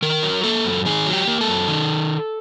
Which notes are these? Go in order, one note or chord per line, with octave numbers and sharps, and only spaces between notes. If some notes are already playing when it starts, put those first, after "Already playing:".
D#3 A#4
F#3
A#3 A4
F#2
D#3 G#4
F#3
G4
A#3
A4
F#2
D#3